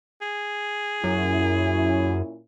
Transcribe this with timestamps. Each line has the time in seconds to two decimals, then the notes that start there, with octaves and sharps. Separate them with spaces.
0.21 G#4
1.04 F#2 A#2 C#4 E4